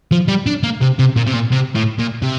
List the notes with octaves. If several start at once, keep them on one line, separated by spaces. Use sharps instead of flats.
F3
G3
D4
A#3
C3
C3
A#2
C3
A#2
C3
A2
A#2
C3